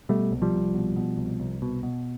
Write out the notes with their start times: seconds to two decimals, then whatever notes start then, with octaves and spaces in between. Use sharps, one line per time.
0.09 B2 G3 A3
0.31 C2
0.42 F3 G3
0.53 C2
0.75 B2
0.96 B2
1.18 C2
1.40 C2
1.62 B2
1.83 B2